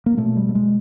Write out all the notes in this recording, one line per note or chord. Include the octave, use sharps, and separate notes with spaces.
A#3
B2 A3
G3
A3
G#3